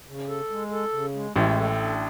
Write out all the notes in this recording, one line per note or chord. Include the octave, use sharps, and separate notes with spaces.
C#3
A4
G#3
A4
C#3
G#3
A1 A2 G#3
A4
D4